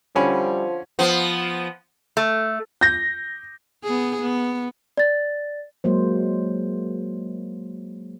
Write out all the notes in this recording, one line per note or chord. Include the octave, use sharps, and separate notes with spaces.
D3 F3 G3 C#4 E4 G#5 B5
F3 B3
A3
G6 A#6
B3 G#4
B3
D5 A6
F#3 G#3 A#3 C5